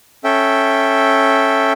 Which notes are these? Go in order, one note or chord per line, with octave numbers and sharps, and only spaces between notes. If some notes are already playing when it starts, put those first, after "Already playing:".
C#4 A4 E5 G5